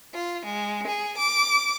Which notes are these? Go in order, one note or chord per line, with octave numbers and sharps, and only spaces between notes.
F4
G#3
G#4
D6